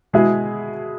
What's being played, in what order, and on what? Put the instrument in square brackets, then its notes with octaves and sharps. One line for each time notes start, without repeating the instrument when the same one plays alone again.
[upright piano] B2 G#3 E4 G#4